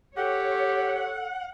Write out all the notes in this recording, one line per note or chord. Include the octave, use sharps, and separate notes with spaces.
G4 A4 C#5 F#5